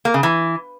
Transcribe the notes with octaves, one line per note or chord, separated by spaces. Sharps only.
A#3
C#3
E3